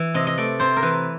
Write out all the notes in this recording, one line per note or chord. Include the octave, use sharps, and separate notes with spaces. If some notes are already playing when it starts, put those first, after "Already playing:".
Already playing: E3
C3 D#5
D#5
A3 D5
C3 C5
A#4
E3 B4